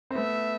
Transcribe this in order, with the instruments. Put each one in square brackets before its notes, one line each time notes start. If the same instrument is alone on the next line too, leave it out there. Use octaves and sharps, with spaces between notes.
[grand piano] C4
[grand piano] A3 B3 [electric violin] E5